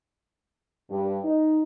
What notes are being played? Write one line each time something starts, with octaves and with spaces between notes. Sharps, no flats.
G2
D#4